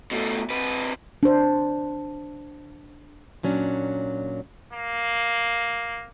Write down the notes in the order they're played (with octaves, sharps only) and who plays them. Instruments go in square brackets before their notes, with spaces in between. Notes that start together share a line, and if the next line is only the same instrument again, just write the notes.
[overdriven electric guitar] B2 A3
C3 B4
[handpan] D4 C5
[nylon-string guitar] A#2 F#3 C#4 D4
[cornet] A#3